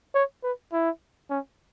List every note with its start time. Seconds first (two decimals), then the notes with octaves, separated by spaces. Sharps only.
0.15 C#5
0.43 B4
0.72 E4
1.30 C#4